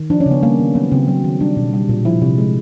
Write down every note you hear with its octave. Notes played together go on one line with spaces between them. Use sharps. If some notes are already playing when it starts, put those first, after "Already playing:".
Already playing: D#3
F3 D4
C#4
C#3
B3
G3 A#3
D#3
F#3 B3
C#3 C4
F#3
D#3
G3 D4
B2
G3
A#2
F3 E4
C3
G#3